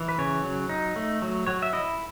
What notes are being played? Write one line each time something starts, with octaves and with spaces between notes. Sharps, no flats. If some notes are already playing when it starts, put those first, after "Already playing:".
Already playing: E3
B4
C#3 C#5
F#3
D#4
A3
F#3
F#3 C#5
E5
E4 D#5